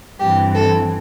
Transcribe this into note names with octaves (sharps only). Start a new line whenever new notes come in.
G2 E3 C4 G4
A4